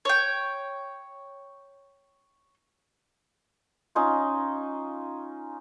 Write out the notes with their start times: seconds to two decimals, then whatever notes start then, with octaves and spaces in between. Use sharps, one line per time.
0.05 C#5 G5
3.95 C#4 D#4 F4